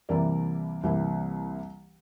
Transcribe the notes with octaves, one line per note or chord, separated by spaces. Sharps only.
C2 C3 E3 A#3 E4 A#4 D5
C2 C3 E3 A#3 E4